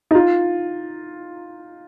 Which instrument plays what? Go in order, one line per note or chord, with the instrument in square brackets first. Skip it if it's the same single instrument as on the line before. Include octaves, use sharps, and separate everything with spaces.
[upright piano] D#4
F4